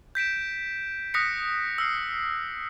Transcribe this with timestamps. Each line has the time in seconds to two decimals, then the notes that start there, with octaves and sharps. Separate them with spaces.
0.15 G6 B6 D7 E7
1.14 D#6 F#6 A#6 B6 C#7
1.78 E6 F6 C7